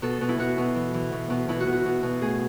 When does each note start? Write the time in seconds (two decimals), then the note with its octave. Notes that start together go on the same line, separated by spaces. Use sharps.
0.02 B2 A4
0.21 B2
0.29 E4
0.39 B2 F#4
0.58 B2
0.75 E3
0.94 E3
1.12 B2
1.30 B2
1.49 B2 E4
1.60 F#4
1.67 B2
1.73 F#4
1.86 B2
2.03 B2
2.21 A2 G#4